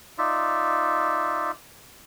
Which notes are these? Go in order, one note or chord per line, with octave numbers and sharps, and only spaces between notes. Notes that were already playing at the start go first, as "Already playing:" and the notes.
D#4 F4 D5 E5